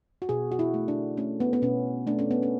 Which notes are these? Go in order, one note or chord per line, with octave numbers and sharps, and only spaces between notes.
F#4
B2 G#4
F#4
E4
A3
D4
A3 C#4
B3
B3
B2 C#4
A3 D4
C#4
B3
C#4